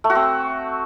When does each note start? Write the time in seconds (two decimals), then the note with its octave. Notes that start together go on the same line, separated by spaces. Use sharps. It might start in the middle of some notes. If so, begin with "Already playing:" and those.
0.04 A3
0.10 F#4
0.15 C4